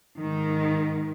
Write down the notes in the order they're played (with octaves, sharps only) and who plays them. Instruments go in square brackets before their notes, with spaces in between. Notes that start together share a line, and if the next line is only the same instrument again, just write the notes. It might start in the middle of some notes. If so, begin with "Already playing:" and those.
[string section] G#2 D#3